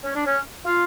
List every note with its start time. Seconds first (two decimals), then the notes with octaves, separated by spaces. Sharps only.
0.04 C#4
0.15 D4
0.26 C#4
0.65 F4